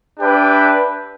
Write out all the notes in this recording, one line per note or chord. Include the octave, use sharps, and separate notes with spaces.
D4 G4 B4 E5 G5